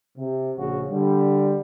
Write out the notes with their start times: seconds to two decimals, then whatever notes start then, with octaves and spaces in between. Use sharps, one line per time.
0.18 C3
0.57 A#1 C#3 F#4
0.89 D3 G3